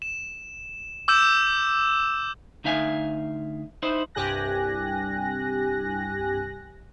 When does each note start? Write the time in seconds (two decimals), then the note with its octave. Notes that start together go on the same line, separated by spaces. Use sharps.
0.02 E7
1.08 D6 E6 G6 E7
2.64 D2 D#4 E5 F5 G#5
3.83 D#4 E4 C5
4.15 C2 G2 G4 G#5 F#6 A#6